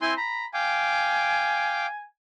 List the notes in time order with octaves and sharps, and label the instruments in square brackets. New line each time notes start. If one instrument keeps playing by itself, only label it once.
[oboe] C4 [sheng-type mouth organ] E4 G#5 C6
[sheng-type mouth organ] A#5 [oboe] B5
[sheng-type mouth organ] F5 G5 D6 [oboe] G#5